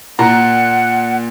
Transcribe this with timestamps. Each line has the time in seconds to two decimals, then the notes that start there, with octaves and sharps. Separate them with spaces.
0.19 A#2 F#5 A#5